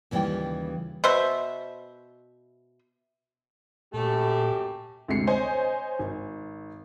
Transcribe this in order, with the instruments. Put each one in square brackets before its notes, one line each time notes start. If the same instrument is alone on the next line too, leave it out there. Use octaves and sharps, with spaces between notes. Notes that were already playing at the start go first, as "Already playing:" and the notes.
[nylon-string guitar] D#2 C#3 E3 G3 F4 G5
[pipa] B2 C5 E5
[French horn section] F#2 G4 [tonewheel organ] A#2 [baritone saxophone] A3
[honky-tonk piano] D2 C3 G#3 C4 C7 C#7
C5 C#5 D#5 G#5
G#1